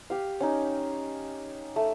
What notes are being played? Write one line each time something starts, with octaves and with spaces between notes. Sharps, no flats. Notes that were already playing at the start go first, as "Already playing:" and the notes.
G4 F5
C#4 D#4
A3